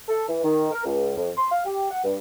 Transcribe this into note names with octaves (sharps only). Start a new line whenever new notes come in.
A4
E3
D#3
A#4
C#2
F2
C6
F5
G4
F#5
G2